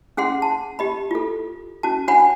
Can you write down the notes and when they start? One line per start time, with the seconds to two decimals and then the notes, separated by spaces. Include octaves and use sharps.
0.17 C#4 G#4 F#5 C6
0.42 A5
0.79 G4 D#5 B5
1.11 F4 A4
1.83 C#4 F#4 A5
2.08 D4 F#4 C#5 F#5 G#5 B5